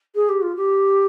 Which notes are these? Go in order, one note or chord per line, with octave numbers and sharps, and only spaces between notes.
G#4
G4
F4
G4